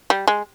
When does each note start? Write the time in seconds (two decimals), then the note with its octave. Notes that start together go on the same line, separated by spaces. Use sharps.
0.10 G3
0.28 G#3